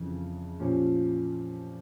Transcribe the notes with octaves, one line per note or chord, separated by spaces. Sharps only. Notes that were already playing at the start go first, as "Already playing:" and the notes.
Already playing: F2 C#3 E3
A#2 F3 C#4 G4